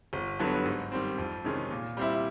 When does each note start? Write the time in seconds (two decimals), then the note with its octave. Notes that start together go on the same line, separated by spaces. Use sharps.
0.13 G1
0.39 G2 D3 F#3 B3
0.65 G#2
0.92 D#3 G3 C4
1.18 F2
1.44 C3 D#3 G#3 C#4
1.71 A#2
1.97 G3 C4 E4